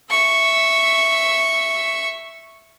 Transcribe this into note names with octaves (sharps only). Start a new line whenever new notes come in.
E5 C#6